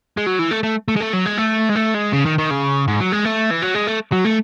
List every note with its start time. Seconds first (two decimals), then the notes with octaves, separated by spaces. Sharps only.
0.17 G#3
0.26 F#3
0.39 E3
0.51 A3
0.63 A3
0.88 A3
0.96 G#3
1.01 A3
1.13 F#3
1.26 G#3
1.38 A3
1.70 G#3
1.76 A3
1.95 G#3
2.13 C#3
2.25 D#3
2.38 D#3
2.50 C#3
2.88 G#2
3.00 F#3
3.12 G#3
3.25 A3
3.51 E3
3.62 F#3
3.75 G#3
3.87 A3
4.12 F#3
4.25 A3